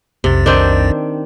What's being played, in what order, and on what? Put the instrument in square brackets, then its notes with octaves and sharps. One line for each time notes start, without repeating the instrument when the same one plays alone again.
[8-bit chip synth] B1 F2 A6 [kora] C3
[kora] D#3 C4 D4